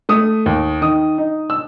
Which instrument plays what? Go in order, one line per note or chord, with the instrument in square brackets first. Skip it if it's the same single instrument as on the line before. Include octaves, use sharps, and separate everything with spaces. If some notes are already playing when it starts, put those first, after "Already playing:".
[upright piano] A3 D#6
D#2
D#3 D#6
D#4
E6